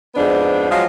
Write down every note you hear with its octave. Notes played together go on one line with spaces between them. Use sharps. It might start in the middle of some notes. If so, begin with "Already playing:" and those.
F2 G#2 B3 D4
F3 F#3 G#3 F4